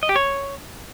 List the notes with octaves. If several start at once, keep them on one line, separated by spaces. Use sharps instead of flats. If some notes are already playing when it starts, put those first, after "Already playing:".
D#5
G4
C#5